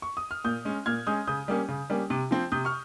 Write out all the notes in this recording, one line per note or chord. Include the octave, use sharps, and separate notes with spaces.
C#6
D#6
F6
A#2 D#6 G6
G#3 C#4
A#2 F6 G#6
G#3 C#4 D#6 G6
C#3 D#6 G6
G3 A#3 C#4
C#3
G3 A#3 C#4
C3
F3 C4
C3 D#6 G6
C#6 F6